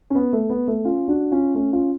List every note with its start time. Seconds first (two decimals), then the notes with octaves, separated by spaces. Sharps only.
0.10 C#4
0.15 B3
0.33 A3
0.50 B3
0.68 A3
0.84 C#4 F4
1.08 D4 F#4
1.31 C#4 F4
1.55 A3 C#4
1.72 C#4 F4